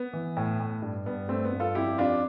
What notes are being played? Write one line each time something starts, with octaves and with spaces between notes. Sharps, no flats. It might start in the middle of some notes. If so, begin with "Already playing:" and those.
Already playing: B3
E3
A2
A2
G2
G2 B3
G2 A3 C4
B3
G2
F4 A4
F2 E4 G4
F2 D4 F4